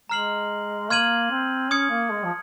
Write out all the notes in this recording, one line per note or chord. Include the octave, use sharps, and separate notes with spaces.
G#3 A#5 F6 C7 F#7
A#3 C6 F6 G#6 D#7 F#7
C4
C#4 D#6 G#6 C#7
A#3
G#3
F3